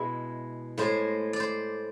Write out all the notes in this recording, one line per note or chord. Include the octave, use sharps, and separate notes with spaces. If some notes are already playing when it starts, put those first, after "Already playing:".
Already playing: B2 G#3 E4
A2 G#3 C5
D5
C5